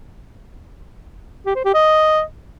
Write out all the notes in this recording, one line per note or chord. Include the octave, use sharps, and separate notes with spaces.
G4
C5
G4
D#5